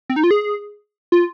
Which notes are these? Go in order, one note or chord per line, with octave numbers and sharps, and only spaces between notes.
C4
D#4
F4
G#4
F4